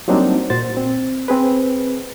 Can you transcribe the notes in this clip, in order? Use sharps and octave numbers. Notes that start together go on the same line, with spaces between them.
F#3 G3 A#3 C4 D4 D#4
A#2 F#4 C5 A6
C4
C4 G#4 B4